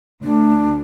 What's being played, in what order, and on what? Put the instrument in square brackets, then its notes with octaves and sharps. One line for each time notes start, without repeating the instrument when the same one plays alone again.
[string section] D2 [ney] D4